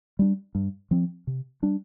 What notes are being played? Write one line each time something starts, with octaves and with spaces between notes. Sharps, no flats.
G3 D4
G2
F3 C4
C3
G3 D4